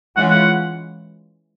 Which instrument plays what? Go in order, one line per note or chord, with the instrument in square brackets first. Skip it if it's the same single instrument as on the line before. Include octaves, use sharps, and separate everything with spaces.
[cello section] E3 G#3 C#4 F4 [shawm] F#5
[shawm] F#5